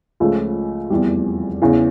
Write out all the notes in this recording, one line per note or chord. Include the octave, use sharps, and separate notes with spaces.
C#2 C#3 F3 A3
F1 E2 E3 G3
E2 C#3 E3